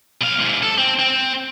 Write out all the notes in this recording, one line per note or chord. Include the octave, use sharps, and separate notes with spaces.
B1 F5
G#2 C3
A4
C4
C4